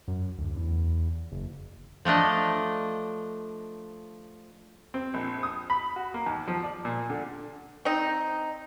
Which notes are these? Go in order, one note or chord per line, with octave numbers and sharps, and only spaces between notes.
F#2
D2
E2
F#1
F3 A3 D4 D#5
C4
A#1
D#6
B5
F#4
A#3
D#2
F3
D5
A#2
D3
C4 D#4